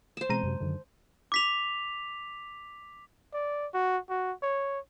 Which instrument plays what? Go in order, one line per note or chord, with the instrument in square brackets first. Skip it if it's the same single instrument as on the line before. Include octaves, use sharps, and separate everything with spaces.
[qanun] C5 A5
[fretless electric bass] B2 E3 C4 [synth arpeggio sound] G#3 A#5 D#7
[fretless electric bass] F#2 C3 F#3
F#2 D3 D#3
[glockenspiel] D6 B6 F7
[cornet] D5
F#4
F#4
C#5